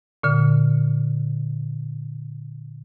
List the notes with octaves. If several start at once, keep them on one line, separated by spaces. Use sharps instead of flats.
A#2 D3 F6